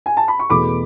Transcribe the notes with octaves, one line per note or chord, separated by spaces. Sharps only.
G#5
A5
B5
C#6
E2 B2 A3 B5 D6